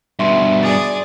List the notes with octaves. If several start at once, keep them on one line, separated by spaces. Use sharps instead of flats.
G2 B2 E5 C6 C#6
G#4 D5 A6